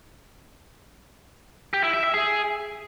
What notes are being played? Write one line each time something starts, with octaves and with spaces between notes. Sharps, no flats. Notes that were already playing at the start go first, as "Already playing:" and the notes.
G4
E4
E5
E5
G#4